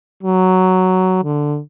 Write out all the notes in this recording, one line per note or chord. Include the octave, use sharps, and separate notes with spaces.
F#3
D3